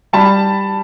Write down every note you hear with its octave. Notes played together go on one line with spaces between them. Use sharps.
G3 A5 B5